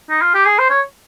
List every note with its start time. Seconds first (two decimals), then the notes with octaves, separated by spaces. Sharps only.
0.10 D#4
0.21 F4
0.34 G4
0.45 G#4
0.59 C5
0.70 C#5